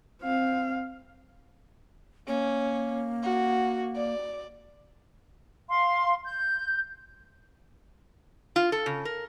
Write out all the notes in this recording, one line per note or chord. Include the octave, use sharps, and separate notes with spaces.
C4 F5
A#3 C#4
F#4
D5
F5 C6
G6
F4
A4
C#3
A#4